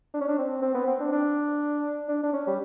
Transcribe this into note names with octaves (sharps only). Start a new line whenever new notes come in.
D4
C#4
D4
C4
C4
B3
C4
D4
D4
D4
D4
C#4
G3